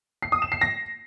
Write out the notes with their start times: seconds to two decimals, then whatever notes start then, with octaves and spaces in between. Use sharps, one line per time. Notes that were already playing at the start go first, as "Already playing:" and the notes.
0.22 C7
0.32 D#6
0.42 E7
0.52 C7
0.61 A#6